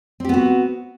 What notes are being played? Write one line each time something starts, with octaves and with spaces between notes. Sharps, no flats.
B3 C4 F#4 G4